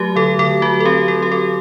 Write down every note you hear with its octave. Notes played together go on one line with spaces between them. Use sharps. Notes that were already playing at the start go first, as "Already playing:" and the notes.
Already playing: F#3 A3 F#4 G4
D3 A4
D3 A4
F#3 F#4
A4
C4 G4
F#3 A4
G4
C4 A4